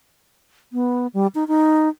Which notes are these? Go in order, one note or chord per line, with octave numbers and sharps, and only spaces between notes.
B3
G3
D#4
D#4